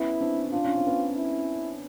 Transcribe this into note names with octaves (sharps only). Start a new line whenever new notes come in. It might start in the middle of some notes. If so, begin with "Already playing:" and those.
Already playing: B3 C#4 E4
C4 D4
D4 F4
C#4
C4
B3 C#4
E4